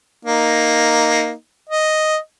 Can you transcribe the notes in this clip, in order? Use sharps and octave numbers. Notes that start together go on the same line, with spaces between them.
A#3 D#4
D#5